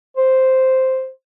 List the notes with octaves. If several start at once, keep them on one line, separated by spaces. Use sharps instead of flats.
C5